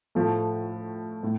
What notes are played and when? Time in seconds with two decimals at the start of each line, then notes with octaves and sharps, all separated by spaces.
0.15 A2 F3 A3
1.23 A2